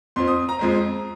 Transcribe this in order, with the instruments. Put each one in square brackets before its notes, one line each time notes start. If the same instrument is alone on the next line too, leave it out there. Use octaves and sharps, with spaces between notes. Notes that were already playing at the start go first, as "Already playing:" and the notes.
[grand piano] F2 F3 C4 C6
D#6
A#5
F2 F3 G#3 C4